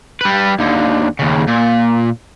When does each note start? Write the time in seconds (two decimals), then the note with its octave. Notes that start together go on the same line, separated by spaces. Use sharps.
0.21 G3 B4
0.59 D#2 D3
1.19 D#2 C#3
1.48 A#2